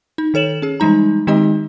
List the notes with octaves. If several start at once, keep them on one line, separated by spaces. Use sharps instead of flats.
D#4
D#3 A4 C#5 E7 F#7
C#4 G#4
E3 G3 G#3 D#4 A#5
D#3 G#3 C4 D#4 G4 D#5